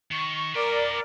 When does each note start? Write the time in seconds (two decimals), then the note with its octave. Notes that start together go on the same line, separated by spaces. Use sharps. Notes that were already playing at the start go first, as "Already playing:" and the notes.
0.11 D#3 C#6
0.55 A#4 B4 D5 G5